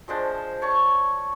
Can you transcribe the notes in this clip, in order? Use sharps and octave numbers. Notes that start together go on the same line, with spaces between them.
F3 G#3 D4 C5
C#5 D5 A5 C#6